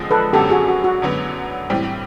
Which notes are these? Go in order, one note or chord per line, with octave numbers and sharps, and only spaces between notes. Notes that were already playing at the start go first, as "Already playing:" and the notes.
Already playing: D3 F3 G#3 C4
A4 B4
F#2 D3 F#3 B3 G4 A4
F#4 G#4
F#4
F#4
F#2 D3 F#3 B3
A2 E3 G3 C4